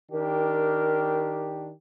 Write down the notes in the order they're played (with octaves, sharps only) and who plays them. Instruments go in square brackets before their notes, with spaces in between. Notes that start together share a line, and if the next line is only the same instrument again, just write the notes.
[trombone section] D#3 D4 G4 [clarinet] A#4